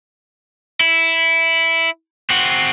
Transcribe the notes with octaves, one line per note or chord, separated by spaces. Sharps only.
E4
C4 F#4